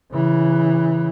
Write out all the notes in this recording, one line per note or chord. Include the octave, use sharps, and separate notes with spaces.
C#3 E3